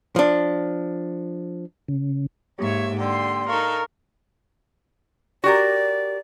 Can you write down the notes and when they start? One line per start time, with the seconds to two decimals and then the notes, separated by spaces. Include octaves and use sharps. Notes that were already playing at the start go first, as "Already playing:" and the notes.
0.16 F3 D4
1.88 C#3
2.59 G#2 A#3 G4 C#5 E5
2.99 D3 G5 C6
3.49 D#4 A4 A#4 F5 C#6
5.44 F#4 G4 A#4 D5